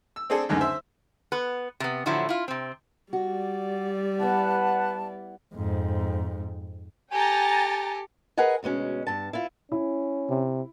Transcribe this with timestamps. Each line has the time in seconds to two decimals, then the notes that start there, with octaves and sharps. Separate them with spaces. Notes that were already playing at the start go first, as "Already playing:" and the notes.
0.16 E6
0.30 C4 D4 G#4 A4
0.49 C#2 F#2 D3 D#3
0.61 C5 E5
1.32 B3 B4
1.80 C3 B3
2.06 A2 D3 F3 F#3 E4
2.29 E4 F4
2.48 C3 C4
3.13 G3 F#4 D5
4.20 B3 E4 B4 F#5 A5
5.55 F2 G#2
7.12 G4 A4 G5 G#5 A#5 A6
8.38 G#4 A#4 B4 D#5 F#5 G#5
8.63 D2 B2 G#3 C#4
9.07 G2 A5
9.33 E4 F4
9.72 C#4 E4
10.29 C3